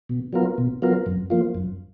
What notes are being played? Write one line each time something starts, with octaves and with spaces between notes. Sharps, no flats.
B2
F#3 B3 F4 A#4
B2
F#3 B3 F4 A#4
F#2
F3 A#3 F4
F#2